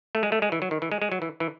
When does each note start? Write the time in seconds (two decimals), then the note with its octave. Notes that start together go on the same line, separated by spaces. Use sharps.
0.15 A3
0.23 G#3
0.32 A3
0.42 G#3
0.52 E3
0.62 F#3
0.71 D#3
0.82 E3
0.92 G#3
1.02 G#3
1.12 F#3
1.22 E3
1.40 E3